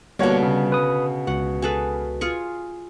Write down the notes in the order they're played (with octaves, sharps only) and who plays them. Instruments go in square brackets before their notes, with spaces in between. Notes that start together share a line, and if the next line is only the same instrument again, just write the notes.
[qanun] B2 D3 [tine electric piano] G3 [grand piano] A#3 C#5 F#5
[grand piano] C#3
[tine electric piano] B4 D#6
[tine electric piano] C#2 F#4 [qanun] F#5
[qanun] G#4 A4 B4
F4 G#4 C#6